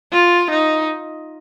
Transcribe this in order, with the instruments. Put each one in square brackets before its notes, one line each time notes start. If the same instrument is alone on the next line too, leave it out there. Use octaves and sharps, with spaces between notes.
[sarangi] F4
D#4